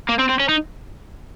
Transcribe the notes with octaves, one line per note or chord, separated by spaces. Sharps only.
A#3
C4
C4
C#4
D#4